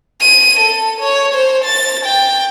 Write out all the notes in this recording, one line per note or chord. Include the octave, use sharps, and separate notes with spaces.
D#7
A4
C#5
C5
A6
G5